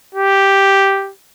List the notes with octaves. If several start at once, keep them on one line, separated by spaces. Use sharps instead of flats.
G4